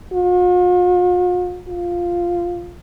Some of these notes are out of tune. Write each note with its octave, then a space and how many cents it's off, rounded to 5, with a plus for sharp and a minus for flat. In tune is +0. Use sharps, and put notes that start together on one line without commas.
F4 +45
F4 +0